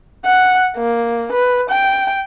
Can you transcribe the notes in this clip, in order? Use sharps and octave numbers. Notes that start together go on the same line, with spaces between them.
F#5
A#3
B4
G5